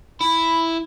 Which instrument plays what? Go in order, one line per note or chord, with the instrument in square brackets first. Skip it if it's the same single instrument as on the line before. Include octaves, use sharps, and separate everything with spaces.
[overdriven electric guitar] E4 [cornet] B5